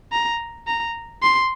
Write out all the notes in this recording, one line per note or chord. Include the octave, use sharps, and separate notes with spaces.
A#5
A#5
C6